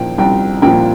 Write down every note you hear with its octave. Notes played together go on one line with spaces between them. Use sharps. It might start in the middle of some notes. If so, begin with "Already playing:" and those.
Already playing: A#2 F3 G5
C2 G5
A#2 F3 G5